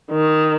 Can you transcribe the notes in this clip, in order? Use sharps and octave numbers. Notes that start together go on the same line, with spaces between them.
D#3